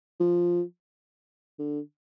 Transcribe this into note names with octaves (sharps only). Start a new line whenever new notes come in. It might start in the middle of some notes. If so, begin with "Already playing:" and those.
F3
D3